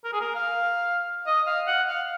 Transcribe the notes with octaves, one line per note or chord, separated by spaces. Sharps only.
A#4
G#4
A#4
F5
D#5
F5
F#5
F5